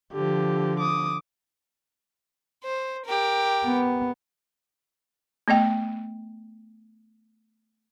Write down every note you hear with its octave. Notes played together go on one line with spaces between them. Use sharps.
D3 F3 G4
D6 D#6
C5
G4 A#4
B3
A3 B3 D#5 G5